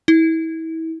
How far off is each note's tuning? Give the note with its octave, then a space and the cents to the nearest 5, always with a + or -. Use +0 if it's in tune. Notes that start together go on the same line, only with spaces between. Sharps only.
E4 -30